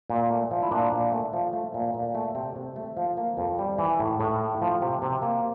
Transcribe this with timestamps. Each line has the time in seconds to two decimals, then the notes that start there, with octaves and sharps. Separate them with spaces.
0.10 A#2
0.30 A3
0.51 F3
0.63 E4
0.71 A#2 D4
0.92 A#2
1.12 A3
1.33 F3
1.53 A3
1.74 A#2
1.94 A#2
2.15 A3
2.35 C3 C4
2.56 C3
2.76 A3
2.97 F3
3.17 A#3
3.37 F2
3.59 G3
3.78 E3
3.99 A2
4.20 A2
4.40 A3
4.61 F3
4.82 C3
5.02 C3
5.22 A#3